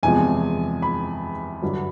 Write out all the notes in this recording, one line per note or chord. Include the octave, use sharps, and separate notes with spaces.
E2 C3 F3 G#3 G#5
B5
G2 D3 F#3